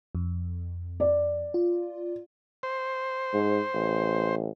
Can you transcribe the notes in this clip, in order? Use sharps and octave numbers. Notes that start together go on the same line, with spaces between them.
F2
D5
F4
C5
G#2
A1